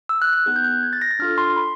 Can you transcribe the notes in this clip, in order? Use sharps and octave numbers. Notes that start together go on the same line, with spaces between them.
E6
F#6
F#6
B3 D#4 G#4 F#6
G6
F#6
G#6
A6
A#6
A6
D4 F4 A4 F6
C6
B5